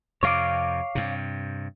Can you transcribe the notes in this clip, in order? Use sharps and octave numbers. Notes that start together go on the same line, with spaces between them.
F2 C3 C#5 F5 D6
G2 C3